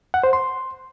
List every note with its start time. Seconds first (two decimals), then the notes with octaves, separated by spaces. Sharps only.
0.14 F#5
0.24 C5
0.33 C6